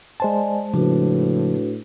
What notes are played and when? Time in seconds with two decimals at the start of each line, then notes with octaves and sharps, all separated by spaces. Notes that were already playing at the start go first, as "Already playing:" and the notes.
0.20 G#3 C5 D5 D#5 G#5 A5
0.74 A2 C#3 F3 D4 F#4 B4